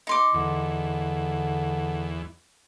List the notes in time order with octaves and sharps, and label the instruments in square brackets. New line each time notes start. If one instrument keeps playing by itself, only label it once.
[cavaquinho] D#4 C6 D6
[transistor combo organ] E2 [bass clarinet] D3